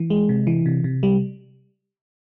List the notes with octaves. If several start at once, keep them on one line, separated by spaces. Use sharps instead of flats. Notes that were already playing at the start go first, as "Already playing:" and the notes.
Already playing: E3
G#3
C3
E3
C3
C3
G3